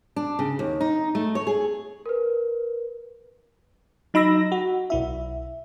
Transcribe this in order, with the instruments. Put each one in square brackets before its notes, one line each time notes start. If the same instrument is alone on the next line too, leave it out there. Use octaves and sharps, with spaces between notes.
[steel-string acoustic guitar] D4
C#3
D#2
D#4
A3
C#5
G#4
[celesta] A#4 B4
[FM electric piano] F#3 D#4 B5 E6 A#6
F#4
B1 E4 E5